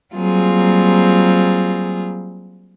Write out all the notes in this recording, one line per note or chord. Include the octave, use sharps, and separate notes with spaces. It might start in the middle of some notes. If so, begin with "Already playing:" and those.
F#3 G3 A#3 C4 F4 G#4